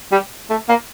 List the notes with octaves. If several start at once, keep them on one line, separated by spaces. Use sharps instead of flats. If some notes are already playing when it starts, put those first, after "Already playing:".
G3
A3
A#3